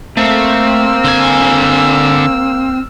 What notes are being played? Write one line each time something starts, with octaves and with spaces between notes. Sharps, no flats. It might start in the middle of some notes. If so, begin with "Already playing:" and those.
A3 A#3 C4 E6 F6
D3 G#5